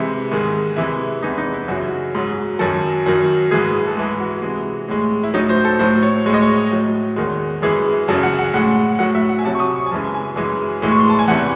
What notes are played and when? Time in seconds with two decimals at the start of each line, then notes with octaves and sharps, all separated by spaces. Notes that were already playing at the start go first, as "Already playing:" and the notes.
Already playing: C3 E3 G#3 E4
0.31 G#2 D#3 G#3
0.76 C3 E3 G#3 E4
1.22 E2 C3 E3 G#3 D#4
1.38 D#4
1.54 E4
1.68 F#2 C#3 F#3 F#4
2.15 G#2 F#3
2.59 F#2 D#3 F#3 A4
3.06 F#2 D#3 F#3
3.51 G#2 E3 G#3 G#4
3.87 A4
3.97 G#2 E3 G#3 G#4
4.20 F#4
4.42 C3 E3 G#3
4.88 A2 G#3
5.24 E4
5.34 A2 F#3 D#4
5.49 C5
5.65 A4
5.79 A2 F#3 C5
6.02 C#5
6.26 A2 G#3 C#5
6.34 D#5
6.42 C#5
6.71 A2 F#3
7.16 E2 D#3 G#3
7.62 F#2 E3 G#3 G#4
8.08 F#2 C#3 F#3 A4
8.23 F#5
8.39 F#5
8.53 A2 G#3 F#5
8.99 A2 F#3 F#5
9.15 E5
9.29 F#5
9.39 G#5
9.45 C3 F#3 A5
9.55 C#6
9.60 D#6
9.76 C#6
9.86 G#5
9.91 F#2 C#3 E3 G#3 A5
10.14 G#5
10.36 F#2 E3 G#3
10.82 A2 E3 G#3
10.91 C#6
11.00 C6
11.09 A5
11.19 G#5
11.28 E2 C3 E3 F#5